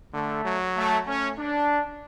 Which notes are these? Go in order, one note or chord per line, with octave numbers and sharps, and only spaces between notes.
D3 A3
F#3
A3
A3 C#4
D4